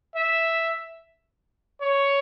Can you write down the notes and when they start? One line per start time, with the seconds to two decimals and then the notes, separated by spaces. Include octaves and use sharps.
0.16 E5
1.81 C#5